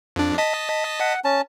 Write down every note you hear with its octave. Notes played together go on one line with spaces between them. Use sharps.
F2 D4
D#5 A5 B6
F#5
C#4 A5